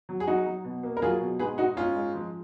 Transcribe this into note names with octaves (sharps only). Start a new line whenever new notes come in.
F#3
G#4
F#3 D#4 F#4
F#3
B2
A#3
A#4
F#3 F4 G#4
B2
G#2 G#4 B4
G#2 D#4 F#4
G#2 C#4 F4
G#3
F3